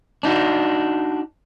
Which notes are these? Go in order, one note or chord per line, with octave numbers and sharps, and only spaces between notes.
D4 D#4 F#4